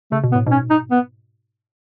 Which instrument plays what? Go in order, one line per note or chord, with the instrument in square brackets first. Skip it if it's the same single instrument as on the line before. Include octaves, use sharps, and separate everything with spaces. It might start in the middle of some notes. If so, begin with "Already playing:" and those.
[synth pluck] C#3 [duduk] A3
[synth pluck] B2
[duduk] B3
[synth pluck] A2
[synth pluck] G#2 B2 [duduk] C#4
[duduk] D#4
B3